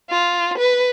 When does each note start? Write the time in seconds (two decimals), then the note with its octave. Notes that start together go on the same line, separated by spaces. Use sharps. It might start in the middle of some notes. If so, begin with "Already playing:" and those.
0.10 F4
0.58 B4